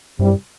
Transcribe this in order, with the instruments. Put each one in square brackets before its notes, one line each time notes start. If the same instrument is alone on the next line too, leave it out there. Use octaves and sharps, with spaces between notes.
[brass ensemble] C2 C3 G3 [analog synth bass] G2